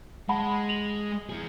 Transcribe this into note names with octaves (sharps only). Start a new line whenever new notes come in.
G#3 F#5 A5 B5
F7 F#7
E3 G#4